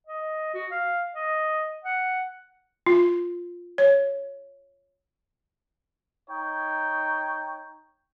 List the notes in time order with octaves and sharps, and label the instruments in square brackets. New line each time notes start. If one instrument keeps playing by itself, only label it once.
[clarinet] D#5
F#4
F5
D#5
F#5
[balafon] F4
C#5
[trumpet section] D#4 C#5 G5